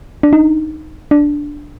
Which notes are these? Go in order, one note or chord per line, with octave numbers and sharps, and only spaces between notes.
D4
D#4
D4